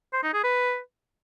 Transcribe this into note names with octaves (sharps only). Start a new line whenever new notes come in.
C5
D#4
G#4
B4